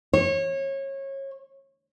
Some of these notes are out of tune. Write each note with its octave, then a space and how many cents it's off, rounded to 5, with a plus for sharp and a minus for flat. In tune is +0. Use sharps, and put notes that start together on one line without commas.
C#5 -25